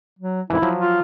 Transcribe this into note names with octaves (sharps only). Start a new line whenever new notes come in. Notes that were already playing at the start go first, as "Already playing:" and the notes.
F#3
F2 G#2 E3 E4
F3 F#3
F4